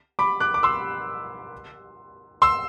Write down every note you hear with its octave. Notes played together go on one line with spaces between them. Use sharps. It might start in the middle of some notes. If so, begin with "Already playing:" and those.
B5 D6
D6 F#6
D6
C6 E6
C6 E6